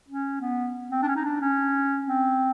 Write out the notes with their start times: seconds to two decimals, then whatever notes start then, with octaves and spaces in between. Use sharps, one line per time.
0.08 C#4
0.41 B3
0.91 C4
1.03 D4
1.08 C#4
1.16 D#4
1.25 D4
1.41 C#4
2.07 C4